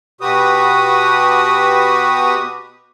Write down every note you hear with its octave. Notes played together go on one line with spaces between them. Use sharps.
B2 F#4 G4 B4 D#6